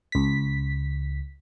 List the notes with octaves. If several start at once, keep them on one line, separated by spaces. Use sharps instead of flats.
C#2 B6